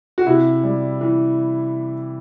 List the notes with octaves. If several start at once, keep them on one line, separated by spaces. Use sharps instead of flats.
F#4
C3 E4
G3
E3